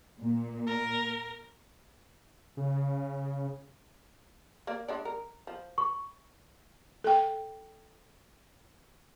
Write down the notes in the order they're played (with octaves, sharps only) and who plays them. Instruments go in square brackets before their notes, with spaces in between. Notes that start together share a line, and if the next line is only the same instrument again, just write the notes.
[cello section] A#2
[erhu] A#4
[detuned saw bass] C#3
[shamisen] A#3 D5
G#3 D4 D5
A#4
F3
[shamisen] B4 [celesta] C#6
[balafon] A4 G5